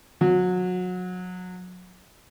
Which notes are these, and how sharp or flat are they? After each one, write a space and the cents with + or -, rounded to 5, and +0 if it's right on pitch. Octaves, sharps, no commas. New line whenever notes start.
F#3 -25